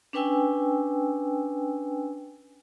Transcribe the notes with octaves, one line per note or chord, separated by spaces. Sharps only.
C#4 D4 B4 G5 G#5 E6